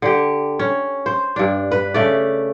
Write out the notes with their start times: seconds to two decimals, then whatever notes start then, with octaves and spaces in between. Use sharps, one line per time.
0.02 D3 G4
0.59 C#4
1.06 C5
1.36 G2 D4
1.71 B4
1.94 C#3 A3 D5